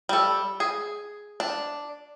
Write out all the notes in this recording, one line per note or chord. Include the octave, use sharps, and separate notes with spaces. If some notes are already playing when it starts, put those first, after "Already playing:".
G3 A4
G#4
D4